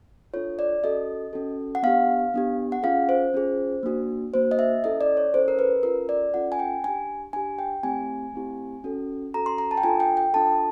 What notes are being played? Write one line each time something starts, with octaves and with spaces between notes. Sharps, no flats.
D4 F4 A4 C#5
D5
C#4 F#4 A4 D#5
C#4 F#4 A4
F#5
B3 D4 G4 F5
B3 D4 G4
F#5
C#4 F4 G#4 F5
C5
C#4 F4 G#4
A#3 D4 F#4
A#3 D4 F#4 C5
D#5
E5
C#4 E4 A4 D#5
D5
C#5
C#4 E4 A4 C5
A#4
B4
C#4 F4 A4 A#4
D5
C#4 F4 A4 F#5
G#5
G5
D4 G4 G#5
D4 G4 G#5
G5
A3 C4 E4 G4 G#5
A3 C4 E4 G4
C#4 F#4 A4
C#4 F#4 A4 A#5
C6
A#5
A5
G5
D4 F4 A4 G#5
G5
G5
D4 F4 A4 A5